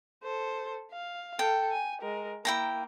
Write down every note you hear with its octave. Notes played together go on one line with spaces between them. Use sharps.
A4 C5
F5
A4 G5
G#5
G#3 A#4
A#3 E4 G5 A#5